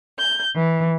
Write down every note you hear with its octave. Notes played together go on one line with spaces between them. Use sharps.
G6
E3